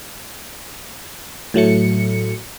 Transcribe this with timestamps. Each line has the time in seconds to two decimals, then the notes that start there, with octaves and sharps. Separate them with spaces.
1.54 A2 F#3 A3 C#7